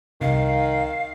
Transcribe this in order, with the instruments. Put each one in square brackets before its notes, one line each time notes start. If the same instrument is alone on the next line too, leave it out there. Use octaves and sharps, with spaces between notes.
[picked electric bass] C2 C3 [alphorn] D#3 [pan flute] F5